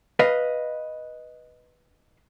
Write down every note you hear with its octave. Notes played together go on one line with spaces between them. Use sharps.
B4 D#5 F5